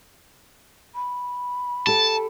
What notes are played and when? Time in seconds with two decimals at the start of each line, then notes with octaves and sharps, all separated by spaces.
0.95 B5
1.87 G4 A4 A5